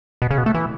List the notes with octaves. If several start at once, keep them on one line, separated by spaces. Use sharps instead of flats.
B2
C#3
B2
A3
E3